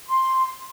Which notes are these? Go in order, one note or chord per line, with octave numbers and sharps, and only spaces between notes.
C6